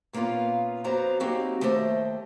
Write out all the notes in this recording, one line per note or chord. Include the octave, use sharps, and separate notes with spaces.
A#2 A#3 B3 C#4 F4
F2 F#3 B3 C5 D5 A#5
F#3 A#3 C4 D#4 F#4 G4
D#2 A3 G4 C5 D#5